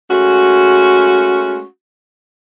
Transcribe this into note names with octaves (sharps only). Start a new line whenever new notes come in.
G#3 A3 C#4 F#4